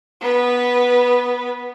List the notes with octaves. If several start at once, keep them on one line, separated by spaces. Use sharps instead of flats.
B3 B4